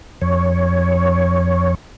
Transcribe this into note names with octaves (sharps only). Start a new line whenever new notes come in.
F2 C#5